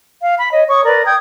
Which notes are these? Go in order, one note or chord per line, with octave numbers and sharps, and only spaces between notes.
F5
B5
C#5 D#5
C#5 C#6 D#6
A#4 B4 D5
G5 D#6 G#6